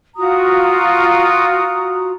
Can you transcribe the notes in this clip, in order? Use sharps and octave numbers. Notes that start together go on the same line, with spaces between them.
F4 F#4 A#5 D#6